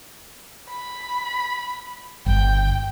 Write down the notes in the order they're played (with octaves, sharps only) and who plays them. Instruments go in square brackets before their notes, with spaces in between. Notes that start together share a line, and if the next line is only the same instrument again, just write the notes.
[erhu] B5
[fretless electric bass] G1 [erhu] G5